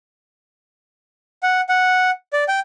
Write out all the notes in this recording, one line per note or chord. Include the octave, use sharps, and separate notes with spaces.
F#5
F#5
D5
G5